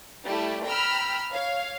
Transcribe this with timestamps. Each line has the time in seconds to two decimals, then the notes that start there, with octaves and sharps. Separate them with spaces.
0.25 G3 A3 E4 G4
0.67 G5 A#5 B5 E6 F6
1.32 C#5 F5